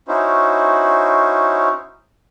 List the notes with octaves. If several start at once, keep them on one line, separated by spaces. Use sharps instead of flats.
C#4 D#4 E4 F#4 C5